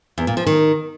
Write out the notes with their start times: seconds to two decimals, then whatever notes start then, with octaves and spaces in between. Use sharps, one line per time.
0.18 E2
0.27 A#2
0.37 F3
0.47 D#3